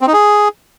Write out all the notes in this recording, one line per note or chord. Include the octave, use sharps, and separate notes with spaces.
C4
D#4
G#4